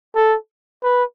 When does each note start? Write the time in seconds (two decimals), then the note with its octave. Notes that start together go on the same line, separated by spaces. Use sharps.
0.15 A4
0.83 B4